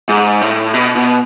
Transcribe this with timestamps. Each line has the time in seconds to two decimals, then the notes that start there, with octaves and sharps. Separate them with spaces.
0.09 G#2
0.41 A2
0.74 B2
0.96 B2